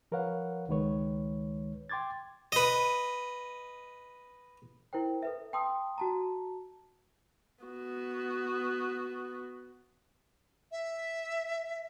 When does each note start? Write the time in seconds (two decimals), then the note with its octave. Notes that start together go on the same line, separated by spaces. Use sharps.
0.12 F3 A#4 B4 C#5 F5 F#5
0.68 C#2 D#3 G#3 B4 C#5
1.89 G5 C6 D6 G#6 A6
2.52 B4 D#5
4.93 E4 A#4 C5 G5
5.23 A4 B4 E5
5.53 G5 A5 C6 D#6 E6
5.98 F#4 A5 A#5
7.64 B3 F#4
10.72 E5